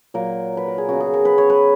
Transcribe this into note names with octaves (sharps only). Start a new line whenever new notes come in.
A#2 F#3 A#3 A#4
B4
A#4
G#4
C#3 F#3 B3 F#4
G#4
A#4
B4
C#5
B4